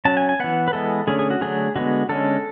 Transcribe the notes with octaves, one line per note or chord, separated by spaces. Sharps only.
F#3 C#4 A5
G#5
G#5
E3 B3 F#5
B4
E3 G#3 B3 A4
D3 A3 C#4 G#4
G#4
F#4
D3 F#3 A3 C#4 G#4
D3 G#3 B3 F#4
D3 G#3 C#4 A4